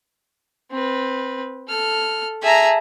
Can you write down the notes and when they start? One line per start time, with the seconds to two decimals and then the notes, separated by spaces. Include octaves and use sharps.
0.71 C4 B4
1.68 A4 F6
2.43 G#4 E5 A5 A#5